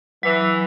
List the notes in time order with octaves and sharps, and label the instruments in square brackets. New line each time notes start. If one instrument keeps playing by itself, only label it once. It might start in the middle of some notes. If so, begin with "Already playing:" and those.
[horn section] E3 [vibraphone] F#3
[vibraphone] F#3